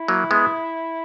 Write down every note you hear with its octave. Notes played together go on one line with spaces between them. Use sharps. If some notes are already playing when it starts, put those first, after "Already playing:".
Already playing: E4
F#3 A#3
G#3 B3